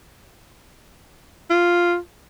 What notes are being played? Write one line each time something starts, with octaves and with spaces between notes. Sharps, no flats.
F4